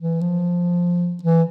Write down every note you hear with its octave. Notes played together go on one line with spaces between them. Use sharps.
E3
F3
E3